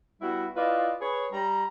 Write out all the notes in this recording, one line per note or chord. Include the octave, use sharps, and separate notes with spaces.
G3 B3 E4 F#4
E4 F4 B4 D5 D#5
G#4 B4 C#5
G3 A#5